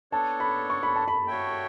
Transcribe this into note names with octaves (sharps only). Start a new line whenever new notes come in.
B3 D4 A4 C#5 A5
B5
C#6
B5
A5
B5
F#4 C#5 E5 G5